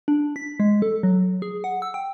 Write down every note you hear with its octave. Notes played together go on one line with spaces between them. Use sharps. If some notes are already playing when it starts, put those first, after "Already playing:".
D4
B6
G#3
A4
F#3
G#4
F#5
E6
G5